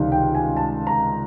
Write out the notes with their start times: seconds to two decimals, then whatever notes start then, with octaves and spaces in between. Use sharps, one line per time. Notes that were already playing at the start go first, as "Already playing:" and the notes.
Already playing: C#2 C3 D#3 G3
0.12 G5
0.35 G#5
0.57 A5
0.87 A#5